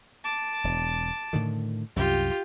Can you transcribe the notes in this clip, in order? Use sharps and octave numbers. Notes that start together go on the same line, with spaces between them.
A5 D6
E1
A2 D3 D#3
C2 F#2 F4 G4